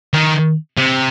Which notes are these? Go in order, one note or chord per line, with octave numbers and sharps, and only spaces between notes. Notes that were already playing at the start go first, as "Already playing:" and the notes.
D#3
C3